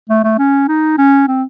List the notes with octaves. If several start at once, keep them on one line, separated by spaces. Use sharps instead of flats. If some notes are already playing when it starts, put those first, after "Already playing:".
A3
A3
C#4
D#4
C#4
C4